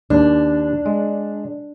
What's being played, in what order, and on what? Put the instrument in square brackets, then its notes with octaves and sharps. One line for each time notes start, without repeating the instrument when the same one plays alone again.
[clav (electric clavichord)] D#2 [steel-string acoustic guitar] D4
[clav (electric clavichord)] G#3